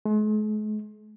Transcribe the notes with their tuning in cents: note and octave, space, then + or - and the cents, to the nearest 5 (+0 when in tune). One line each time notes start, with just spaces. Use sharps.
G#3 +45